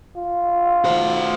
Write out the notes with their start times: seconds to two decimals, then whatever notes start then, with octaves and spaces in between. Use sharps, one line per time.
0.16 F4
0.84 F#4 C5